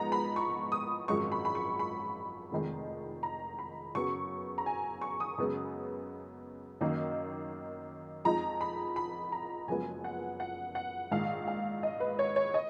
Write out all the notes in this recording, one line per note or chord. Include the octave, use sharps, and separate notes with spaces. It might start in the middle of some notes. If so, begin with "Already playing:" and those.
Already playing: G#2 F3 G#3 B3 D#4 A#5
B5
C#6
D#6
G#1 F#2 F3 G#3 C#6
B5
B5
C#6
B5
F1 F2 D#3 G#3
A#5
B5
F#2 C#3 F#3 B3 C#6
A#5
G#5
C#6
D#6
F#2 C#3 G#3 B3
F#2 D#3 A#3 D#4
F2 F3 G#3 D#4 A#5
B5
B5
A#5
F#1 F#2 F3 G#3 B3 G#5
F#5
F#5
F#5
A#1 G#2 D#3 F5
F5
D#5
B4
C#5
C#5
D#5